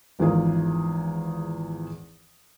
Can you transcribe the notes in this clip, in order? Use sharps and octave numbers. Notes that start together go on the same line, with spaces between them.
G#1 E2 F3 D#4 G#4 F5